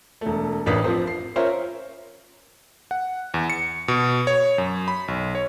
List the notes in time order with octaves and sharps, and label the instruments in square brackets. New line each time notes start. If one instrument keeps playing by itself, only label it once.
[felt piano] E1 A3
A1 D4 A#4 B4 D#6 B6
F3 C4 C5
C7
C#4 F4 A#4 C5 C#5 E5
[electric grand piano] F#5
E2
C#7
B2
C#5
F#2
B5
B1
C#5